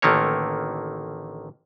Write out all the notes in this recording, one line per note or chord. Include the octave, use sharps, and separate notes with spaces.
A1 D3 D#3 A3 A#3 C#5